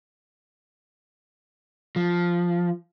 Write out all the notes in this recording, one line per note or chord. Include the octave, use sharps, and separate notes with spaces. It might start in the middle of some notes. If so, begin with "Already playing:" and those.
F3